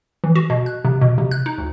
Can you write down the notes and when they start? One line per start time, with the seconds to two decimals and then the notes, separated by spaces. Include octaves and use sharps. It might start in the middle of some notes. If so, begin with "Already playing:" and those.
0.24 E3
0.36 F#4
0.50 B2
0.66 F#6
0.85 C3
1.01 B2
1.18 C3
1.31 F#6
1.46 D#4
1.58 D2